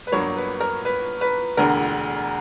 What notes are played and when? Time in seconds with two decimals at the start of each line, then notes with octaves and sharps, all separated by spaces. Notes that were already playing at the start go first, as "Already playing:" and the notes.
0.07 B4
0.12 G1 G2 F#3 A#3 C#5
0.37 B4
0.60 A#4
0.85 B4
1.21 B4
1.57 E1 D2 D3 A#4